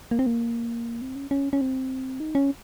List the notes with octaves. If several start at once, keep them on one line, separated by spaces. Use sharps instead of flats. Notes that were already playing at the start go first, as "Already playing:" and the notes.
A#3
C4
A#3
C4
C#4
C#4
C#4
C4
D#4
C#4